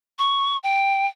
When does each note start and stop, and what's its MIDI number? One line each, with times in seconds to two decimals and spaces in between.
0.19 0.57 85
0.63 1.06 79